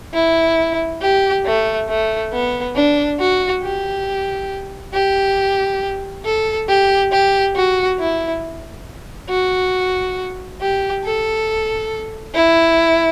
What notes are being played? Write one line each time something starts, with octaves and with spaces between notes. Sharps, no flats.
E4
G4
A3
A3
B3
D4
F#4
G4
G4
A4
G4
G4
F#4
E4
F#4
G4
A4
E4